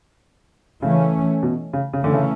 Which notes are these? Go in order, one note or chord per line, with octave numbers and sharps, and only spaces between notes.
C#3 E3 A3 C#4
B2
C#3
C#3
D3 E3 A3 C#4
C#3